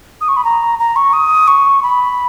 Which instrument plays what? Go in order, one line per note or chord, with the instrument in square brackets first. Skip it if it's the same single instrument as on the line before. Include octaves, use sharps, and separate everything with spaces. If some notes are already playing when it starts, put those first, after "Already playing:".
[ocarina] D#6
C#6
B5
A#5
A#5
C#6
D#6
C#6
B5